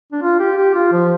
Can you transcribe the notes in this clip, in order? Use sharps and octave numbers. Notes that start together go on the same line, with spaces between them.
D4
F4
G4
G4
F4
F3